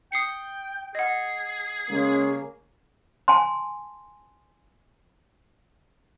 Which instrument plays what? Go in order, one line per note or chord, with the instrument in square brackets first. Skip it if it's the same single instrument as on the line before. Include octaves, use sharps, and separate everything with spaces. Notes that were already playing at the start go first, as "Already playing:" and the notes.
[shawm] G5 [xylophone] D#6 C7 C#7
[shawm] G#4 [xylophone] D#5 F#5
[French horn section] C#3 A#3 C#4 [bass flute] G#3
[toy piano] G#5 A5 C6